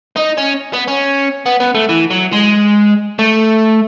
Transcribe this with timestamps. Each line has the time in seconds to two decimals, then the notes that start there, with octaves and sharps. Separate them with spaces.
0.16 D#4
0.37 C#4
0.74 B3
0.88 C#4
1.46 B3
1.60 B3
1.75 A3
1.89 E3
2.11 F#3
2.33 G#3
3.19 A3